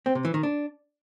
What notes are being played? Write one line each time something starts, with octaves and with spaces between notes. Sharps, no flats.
C4
C3
E3
D#3
D4